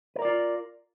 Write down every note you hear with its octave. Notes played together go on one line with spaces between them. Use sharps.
F4 A#4 B4 D5